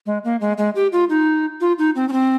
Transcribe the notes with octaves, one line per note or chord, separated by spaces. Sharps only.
G#3
A#3
G#3
G#3
G4
F4
D#4
F4
D#4
C4
C#4
C4